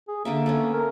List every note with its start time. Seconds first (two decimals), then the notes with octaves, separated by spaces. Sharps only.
0.08 G#4
0.25 D3 A#3 D4 E5
0.46 A3 B3 C#4
0.73 A#4